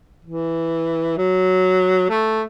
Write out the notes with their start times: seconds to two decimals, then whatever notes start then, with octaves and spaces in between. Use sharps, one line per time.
0.25 E3
1.17 F#3
2.10 A3